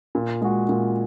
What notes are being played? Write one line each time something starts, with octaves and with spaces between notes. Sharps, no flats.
A#2
G#3 F#4
A#2